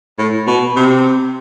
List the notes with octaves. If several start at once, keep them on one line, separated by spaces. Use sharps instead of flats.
A2
B2
C3